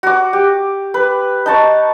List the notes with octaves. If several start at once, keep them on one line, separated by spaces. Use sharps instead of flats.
F#4 D6
G4
B4
D#4 A5 C#6